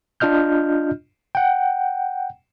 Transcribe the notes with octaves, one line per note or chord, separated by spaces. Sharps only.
D4 F4 D#5 F6 G6
F#5 G5